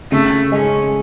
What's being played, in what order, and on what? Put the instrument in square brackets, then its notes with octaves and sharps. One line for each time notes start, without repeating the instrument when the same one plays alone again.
[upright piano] C#3 [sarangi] A3
[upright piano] G#3 [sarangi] C#4